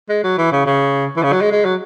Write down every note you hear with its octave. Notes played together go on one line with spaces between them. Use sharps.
G#3
F#3
E3
C#3
C#3
E3
C#3
F#3
G#3
G#3
F#3